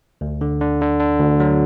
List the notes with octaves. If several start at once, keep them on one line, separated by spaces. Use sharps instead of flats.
D2
D3
D3
D3
D3
D2
F#3